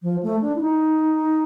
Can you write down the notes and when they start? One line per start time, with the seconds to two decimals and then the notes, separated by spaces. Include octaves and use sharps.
0.03 F3
0.23 A3
0.41 D4
0.56 E4
0.61 D#4